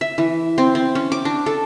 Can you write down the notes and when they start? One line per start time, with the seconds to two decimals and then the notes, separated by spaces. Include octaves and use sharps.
0.01 E5
0.18 E3
0.58 C4
0.75 C4
0.95 C#4
1.12 D6
1.25 D4
1.46 A4